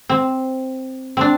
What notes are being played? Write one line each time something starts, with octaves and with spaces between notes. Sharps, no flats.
C4
C4 D4